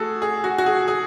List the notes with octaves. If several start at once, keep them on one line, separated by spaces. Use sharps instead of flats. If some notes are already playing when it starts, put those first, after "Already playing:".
Already playing: A3 F#4 G#4 A4
G#4
F#4
F#4
G#4
G#4